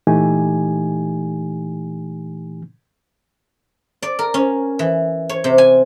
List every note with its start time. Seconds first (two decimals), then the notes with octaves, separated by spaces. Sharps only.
0.07 A#2 E3 A3 D#4 G4 G#5
4.02 D5
4.19 A#4
4.34 C#4
4.79 E3
5.29 C#5
5.44 C3
5.58 G#5